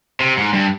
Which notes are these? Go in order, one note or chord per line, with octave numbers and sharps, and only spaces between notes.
C3
G#2
G2